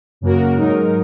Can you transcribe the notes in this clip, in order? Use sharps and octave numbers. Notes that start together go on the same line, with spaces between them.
F#2 C#3 A#3 F#4 A#4
G#2 F#3 D#4 A#4